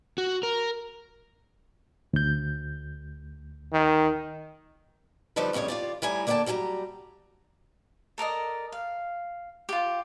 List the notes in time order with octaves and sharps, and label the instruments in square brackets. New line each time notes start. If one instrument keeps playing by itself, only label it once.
[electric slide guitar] F#4
A#4
[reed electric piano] D2 G6
[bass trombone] D#3
[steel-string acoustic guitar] D3 F3 G3 D#4 A4 B4
F2 A2 C#3 G3 C#5
F4 G4 D5
A2 G3 E4 G#5 A#5
D3 A#3 D5 F#5 G5 A5
F#3 G3 G4 G#5 A#5
[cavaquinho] A4 A#4 D5 D#5
F5
F4 G4